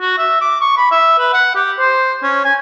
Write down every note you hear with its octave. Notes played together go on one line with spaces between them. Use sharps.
F#4
E5
D6
C#6
B5
E5
B4
F#5
G4
C5
C#4
G#5